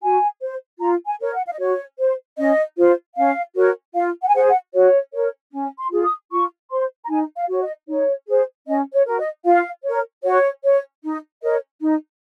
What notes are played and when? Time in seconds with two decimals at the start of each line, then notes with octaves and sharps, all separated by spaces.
0.03 F#4 G#5
0.41 C5
0.80 F4 A#5
1.07 G#5
1.20 A#4 C#5
1.34 F#5
1.46 F5
1.52 D#5
1.59 F#4 C#5
1.98 C5
2.38 C#4 D#5
2.77 F4 C5
3.16 C#4 F5
3.55 F#4 A#4 C#5
3.94 F4 F5
4.22 F#5
4.28 G#5
4.35 G#4 C5 F#5
4.48 F#5
4.73 F#4 C#5
5.14 A#4 C#5
5.52 C#4
5.79 C6
5.91 F4 G#4
6.04 D#6
6.31 F4 C#6
6.71 C5 C6
7.04 A#5
7.09 D#4 G#5
7.36 F5
7.48 F#4 C#5
7.62 D#5
7.88 D#4 C#5
8.27 G#4 C5
8.67 C#4 D#5
8.93 C#5
9.06 F#4 A#4
9.19 D#5
9.45 F4 F5
9.84 A#4 C#5
10.23 F#4 C#5
10.64 C#5
11.03 D#4
11.42 A#4 C#5 D#5
11.81 D#4